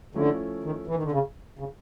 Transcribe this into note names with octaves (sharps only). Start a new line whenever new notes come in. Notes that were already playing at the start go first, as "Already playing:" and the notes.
D3 F3 A3 C#4 E4
D#3
E3
D#3
D3
C#3
C#3